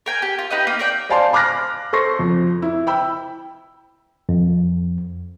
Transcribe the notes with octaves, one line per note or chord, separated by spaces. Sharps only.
A#4 G5 G#5
G4
F4
D#4 G4 B4 D#5
A#3
A#4 D5 G5
C5 D5 F5 G#5 A5 C6
B5 D6 F6 F#6 A#6
A4 C5 C6 C#6 A#6
F2
E4
G5 B5 E6
F2